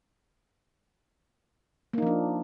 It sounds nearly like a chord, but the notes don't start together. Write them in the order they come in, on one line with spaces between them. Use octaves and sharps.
A#3 D#4 F3 D4